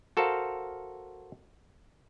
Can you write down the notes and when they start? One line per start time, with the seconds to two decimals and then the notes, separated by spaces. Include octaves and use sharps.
0.17 F#4 A4 A#4 C5 F5